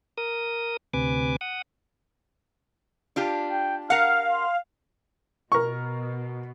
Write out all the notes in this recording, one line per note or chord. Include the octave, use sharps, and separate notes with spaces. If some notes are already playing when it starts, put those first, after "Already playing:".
A#4 D#6
D2 C3 B4 G#5 D6
F#5 D#6
D4 F4 G4
G5
A#4 F5 F#5 F6
C6
B2 A#4 C#6